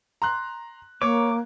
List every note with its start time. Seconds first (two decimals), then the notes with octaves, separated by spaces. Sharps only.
0.22 A#5 C6 F#6
1.02 A#3 C#5 D6